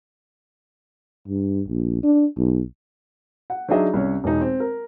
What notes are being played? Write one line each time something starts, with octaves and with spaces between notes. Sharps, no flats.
G2
A#1
D4
B1
F#5
F#3 D4 D#4 G#4 D#5 E5
C2 C#4 C#5
E1 D#4
C4
A#4